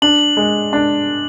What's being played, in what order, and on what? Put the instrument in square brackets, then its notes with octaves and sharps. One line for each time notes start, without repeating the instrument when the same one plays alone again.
[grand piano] D4 [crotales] F#7
[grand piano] G#3
D4